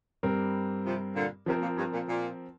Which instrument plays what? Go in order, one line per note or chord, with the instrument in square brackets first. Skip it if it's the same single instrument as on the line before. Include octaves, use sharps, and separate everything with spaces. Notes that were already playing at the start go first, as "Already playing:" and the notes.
[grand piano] G2 G3 C4 A#4
[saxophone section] C3 F3
A#2 D3
[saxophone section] C3 [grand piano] F3 C4 A#4
[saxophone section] A#2
G2
A#2
A#2